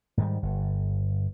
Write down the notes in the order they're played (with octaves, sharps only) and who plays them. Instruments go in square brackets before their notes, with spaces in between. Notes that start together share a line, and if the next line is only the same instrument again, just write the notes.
[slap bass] G#2 D#3 G3
G1